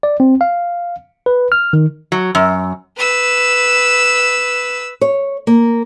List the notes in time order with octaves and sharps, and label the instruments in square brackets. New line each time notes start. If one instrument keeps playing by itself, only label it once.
[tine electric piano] D5
C4
F5
B4
F6
D#3
[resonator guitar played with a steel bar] F#3
F#2
[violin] B4 E6
[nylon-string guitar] C#5
A#3